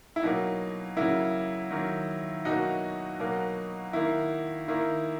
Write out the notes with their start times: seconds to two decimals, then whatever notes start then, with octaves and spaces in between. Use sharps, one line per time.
0.16 E4
0.23 B2 F#3 A#3 D#4
0.97 C#3 F#3 A#3 E4
1.71 D#3 F#3 A#3
2.45 B2 F#3 A#3 D#4 F#4
3.19 B2 F#3 A#3
3.93 D#3 A#3 E4
4.68 D#3 A#3 E4